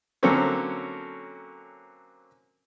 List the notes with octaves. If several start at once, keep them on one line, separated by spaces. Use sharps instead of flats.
D3 F#3 A#3 C4 C#4 A4